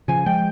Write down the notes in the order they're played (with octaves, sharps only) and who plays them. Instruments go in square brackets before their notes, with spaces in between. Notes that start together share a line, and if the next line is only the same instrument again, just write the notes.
[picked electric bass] C#3 F3 [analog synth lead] G#5
[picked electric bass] F3 G#3 [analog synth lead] G5